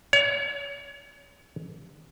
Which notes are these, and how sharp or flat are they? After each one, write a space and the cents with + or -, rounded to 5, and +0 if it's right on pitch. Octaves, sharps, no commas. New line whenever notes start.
C#5 +35